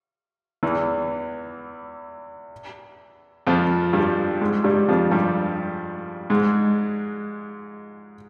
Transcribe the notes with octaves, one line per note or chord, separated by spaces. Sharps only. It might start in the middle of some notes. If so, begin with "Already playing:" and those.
E2 E3
F2 F3
G2 G3
G#2 G#3
G2 G3
F2 F3
G2 G3
G#2 G#3